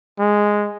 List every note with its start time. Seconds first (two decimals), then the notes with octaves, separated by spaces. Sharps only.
0.19 G#3